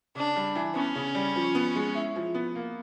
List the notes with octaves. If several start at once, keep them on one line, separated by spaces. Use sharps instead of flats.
C#3 D4
G3
E3
B3 C#4
C#3
G3
F3
B3
G#3
E4
F3
B3
A#3